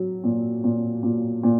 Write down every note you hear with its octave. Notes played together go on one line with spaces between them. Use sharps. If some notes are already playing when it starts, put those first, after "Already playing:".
Already playing: F#3
A#2
A#2
A#2
A#2